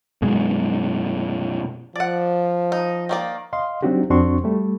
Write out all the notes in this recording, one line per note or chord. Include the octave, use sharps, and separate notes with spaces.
F#2 B2 G#3
F3 D5 F#5
D#4
D#3 A#3 D5
D#5 F5 C6
F#3 C4 D4 D#4 F#4 G4
F2 C4 D4 F#4 C6 C#6
G3 A3